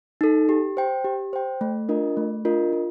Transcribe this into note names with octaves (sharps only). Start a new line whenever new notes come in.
D#4 A4
G4
C5 G5
G4
C5 G5
A3
D4 F4 A#4 D#5
A3
D4 F4 A#4 D#5
F4